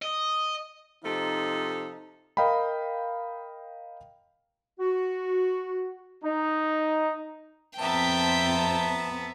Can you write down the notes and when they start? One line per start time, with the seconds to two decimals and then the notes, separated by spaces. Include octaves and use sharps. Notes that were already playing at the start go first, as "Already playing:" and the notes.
0.02 D#5
1.04 C3 F3 D#4 A4
2.37 A#4 D#5 F5 G5 A#5 B5
4.78 F#4
6.23 D#4
7.79 F2 B3 C4 E5 G5 A5 A#5